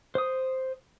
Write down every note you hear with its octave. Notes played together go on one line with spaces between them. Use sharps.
C5 D#6